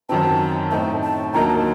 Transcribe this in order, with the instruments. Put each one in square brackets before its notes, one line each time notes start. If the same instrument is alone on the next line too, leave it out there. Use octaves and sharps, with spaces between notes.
[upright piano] F#2 D#3 F#3 C4 [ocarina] A5
[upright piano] A2 A3 C4 D#4 [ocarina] A5
[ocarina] A5
[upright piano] D#2 D3 F#3 A#3 D#4 [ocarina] A#5
[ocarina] A5